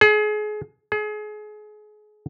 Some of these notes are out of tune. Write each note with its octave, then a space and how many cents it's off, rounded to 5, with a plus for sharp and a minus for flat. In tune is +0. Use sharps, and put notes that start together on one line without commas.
G#4 +30
G#4 +30